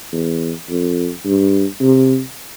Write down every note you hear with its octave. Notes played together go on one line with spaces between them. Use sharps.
E2
F2
G2
C3